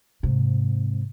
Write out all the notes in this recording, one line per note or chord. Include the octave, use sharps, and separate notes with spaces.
G#2 C3